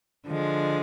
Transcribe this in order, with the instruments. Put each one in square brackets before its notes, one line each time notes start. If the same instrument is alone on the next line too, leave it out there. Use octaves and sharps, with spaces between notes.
[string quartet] D3 F3 G#3